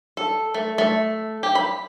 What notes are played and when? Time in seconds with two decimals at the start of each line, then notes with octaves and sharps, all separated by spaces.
0.17 A4
0.54 A3
0.78 A3
1.43 G4
1.55 B5